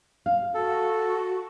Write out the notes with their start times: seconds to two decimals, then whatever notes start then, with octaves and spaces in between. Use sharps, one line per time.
0.26 F5
0.54 F#4 A4